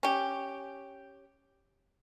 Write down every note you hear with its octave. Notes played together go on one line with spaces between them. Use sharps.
C#4 G4